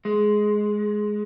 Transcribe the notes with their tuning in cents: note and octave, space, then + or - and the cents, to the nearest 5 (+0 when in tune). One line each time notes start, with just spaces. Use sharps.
G#3 +10